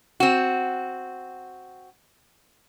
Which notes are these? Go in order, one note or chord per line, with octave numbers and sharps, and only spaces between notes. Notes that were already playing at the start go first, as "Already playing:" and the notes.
C4 F#4